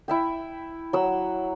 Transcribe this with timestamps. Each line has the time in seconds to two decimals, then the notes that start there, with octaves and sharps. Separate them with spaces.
0.08 E4 E5 G5
0.93 F#3 E6